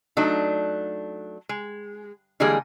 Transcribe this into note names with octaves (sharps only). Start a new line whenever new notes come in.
F#3 A3 D4 D#4
G#3
D3 E3 G3 G#3 A#3 G#4